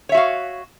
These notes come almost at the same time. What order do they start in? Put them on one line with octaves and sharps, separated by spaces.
C#5 E5 F#4 F5